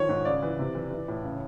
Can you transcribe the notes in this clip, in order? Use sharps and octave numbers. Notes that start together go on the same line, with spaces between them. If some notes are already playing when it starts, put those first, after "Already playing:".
Already playing: D#3 F3 C#5
G#2
C#3 D5
E3
C3
E3
E3
A2
C#3